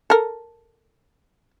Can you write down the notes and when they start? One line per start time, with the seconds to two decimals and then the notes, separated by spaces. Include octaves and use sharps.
0.10 A4 A#4